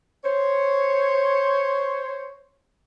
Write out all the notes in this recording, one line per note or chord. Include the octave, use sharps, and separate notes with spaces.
C5 C#5